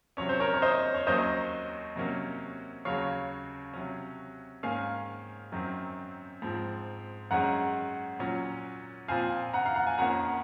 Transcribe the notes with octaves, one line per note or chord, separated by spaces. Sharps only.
C3 F#3 C#4 C#5
C5
A#4 C#5
C#5
C5 D#5
C#5
D#2 D#3 F#3 A#3 C#4 C5 D#5
C3 F#3 A#3 C#4
D#2 C#3 F#3 C#5 F5
C3 F#3 C#4
G#2 D#3 A#3 C#4 F5 G#5
F#2 D#3 F#3 C4
G#2 F3 C4
F#2 D#3 G#3 C#4 F#5 A#5
A#2 F#3 C#4
A#2 F3 C4 F5 G#5
F#5 A#5
F5
F#5
G#5
F2 D#3 A#3 C#4 F#5 A#5